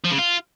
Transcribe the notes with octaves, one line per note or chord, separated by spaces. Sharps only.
F3
C#3
F4